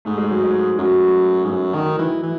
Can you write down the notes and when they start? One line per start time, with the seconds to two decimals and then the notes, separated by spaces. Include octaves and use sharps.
0.05 G#2 A3
0.18 G#3
0.31 F#3
0.44 G#3
0.78 F#2 F#3
1.44 G#2
1.51 F#2
1.74 D#3
1.98 E3
2.23 E3